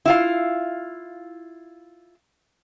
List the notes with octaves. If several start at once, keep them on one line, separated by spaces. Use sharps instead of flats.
E4 F4 F5